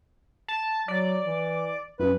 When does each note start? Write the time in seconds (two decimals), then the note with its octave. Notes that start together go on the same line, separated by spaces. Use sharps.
0.48 A5
0.88 F#3 D5
1.25 E3
2.00 F#2 B4